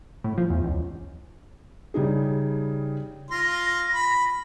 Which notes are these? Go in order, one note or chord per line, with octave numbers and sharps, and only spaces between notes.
A2
F3
E2
C#2
C#3 G3 D#4 G#4
F4 C6 A#6
B5